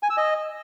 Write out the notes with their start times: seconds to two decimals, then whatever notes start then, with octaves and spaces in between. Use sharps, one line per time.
0.03 G#5
0.10 E6
0.17 D#5